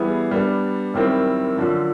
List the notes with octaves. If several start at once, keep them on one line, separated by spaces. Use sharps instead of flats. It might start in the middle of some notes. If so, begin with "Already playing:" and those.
Already playing: E3 G3 B3 E4 G#4
G3 B3 D4
F#2 D#3 G3 C4 E4
F#2 D3 F3